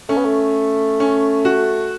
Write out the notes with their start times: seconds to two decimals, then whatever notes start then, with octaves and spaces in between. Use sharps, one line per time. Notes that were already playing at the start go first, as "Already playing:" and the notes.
0.09 A3 C#4
0.17 B3
0.24 A3
1.00 C#4
1.45 F#4